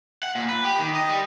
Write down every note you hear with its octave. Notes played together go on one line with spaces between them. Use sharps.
F#5
A#2
B4
G4
D#3
D#5
G3